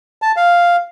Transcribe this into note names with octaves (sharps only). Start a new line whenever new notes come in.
A5
F5